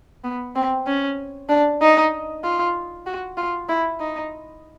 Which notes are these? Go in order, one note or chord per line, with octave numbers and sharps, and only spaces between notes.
B3
C4
C#4
D4
D#4
F4
F#4
F4
E4
D#4